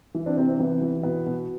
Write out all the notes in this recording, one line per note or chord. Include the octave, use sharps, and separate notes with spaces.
E3
C4 D4
C3 C4
C4
E3 B3
E3
B2 B3
B2